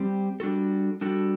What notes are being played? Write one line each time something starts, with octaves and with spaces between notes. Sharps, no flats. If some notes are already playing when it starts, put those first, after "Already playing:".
Already playing: G3 C4 G4
G3 D4 F#4 A4
G3 D4 F#4 A4